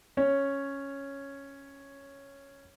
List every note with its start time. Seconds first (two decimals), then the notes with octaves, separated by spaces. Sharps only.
0.17 C#4 C#5